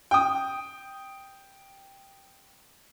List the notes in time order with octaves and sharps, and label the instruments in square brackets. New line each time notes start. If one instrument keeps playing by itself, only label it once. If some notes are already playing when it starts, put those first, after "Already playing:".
[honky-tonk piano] G5 D#6